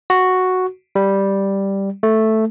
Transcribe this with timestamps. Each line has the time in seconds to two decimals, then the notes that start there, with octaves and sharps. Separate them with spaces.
0.10 F#4
0.95 G3
2.03 A3